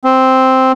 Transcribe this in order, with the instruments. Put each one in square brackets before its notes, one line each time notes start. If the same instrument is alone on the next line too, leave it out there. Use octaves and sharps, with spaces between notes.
[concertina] C4